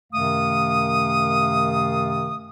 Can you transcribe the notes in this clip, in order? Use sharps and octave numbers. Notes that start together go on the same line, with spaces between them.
F#2 C3 D#3 A3 F5 D#6